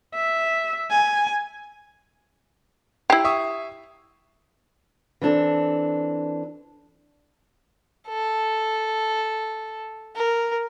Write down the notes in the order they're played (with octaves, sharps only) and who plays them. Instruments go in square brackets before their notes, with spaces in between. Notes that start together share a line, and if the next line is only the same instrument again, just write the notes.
[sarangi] E5
G#5
[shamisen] E4 G4 [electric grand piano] C7
[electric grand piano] E5 C#6 D#6
[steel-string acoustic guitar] E3 C4 D4 A4
[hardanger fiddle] A4
A#4